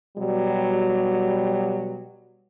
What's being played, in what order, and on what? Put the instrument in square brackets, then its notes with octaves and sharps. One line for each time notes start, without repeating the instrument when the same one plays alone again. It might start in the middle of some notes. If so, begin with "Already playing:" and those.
[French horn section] B2 F#3 G3